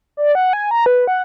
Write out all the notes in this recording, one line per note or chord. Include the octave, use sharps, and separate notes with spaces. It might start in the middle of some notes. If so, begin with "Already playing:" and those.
D5
F#5
G#5
A#5
B4
F#5